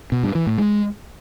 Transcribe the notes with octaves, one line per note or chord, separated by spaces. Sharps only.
B2
G2
E3
A2
G#3